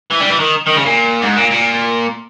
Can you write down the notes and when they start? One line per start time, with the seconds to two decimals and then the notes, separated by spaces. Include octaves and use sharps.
0.11 E3
0.20 G3
0.29 E3
0.39 D#3
0.66 D#3
0.75 C#3
0.85 A#2
1.22 G#2
1.37 A#2
1.51 A#2